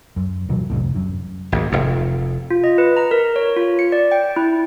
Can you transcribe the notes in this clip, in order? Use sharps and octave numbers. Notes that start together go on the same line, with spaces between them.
F#2
D1 B2 E3 F#3
G1 C2 F2 A2
F#2
G#1 D#2
F1 F2
F4
D#5
B4
A#5
A#4
C#5
F4
C#7
D5
G5
E4